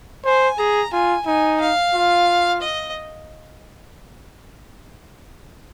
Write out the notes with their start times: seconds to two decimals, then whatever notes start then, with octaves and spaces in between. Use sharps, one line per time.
0.25 C5 G#5
0.58 G#4 A#5
0.92 F4 G#5
1.26 D#4 G#5
1.61 F5
1.94 F4
2.61 D#5